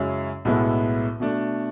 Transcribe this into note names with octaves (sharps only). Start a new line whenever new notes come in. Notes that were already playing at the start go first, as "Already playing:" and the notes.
Already playing: F#2 C#3 G#3 C#4 E4
B1 A2 G#3 B3 E4
B2 A3 D4